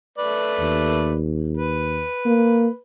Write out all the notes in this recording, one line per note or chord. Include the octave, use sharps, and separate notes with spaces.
A3 B4 D5
D#2
B4
A#3